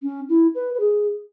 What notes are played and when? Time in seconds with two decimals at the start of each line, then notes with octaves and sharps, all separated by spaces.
0.03 C#4
0.29 E4
0.55 B4
0.74 B4
0.80 G#4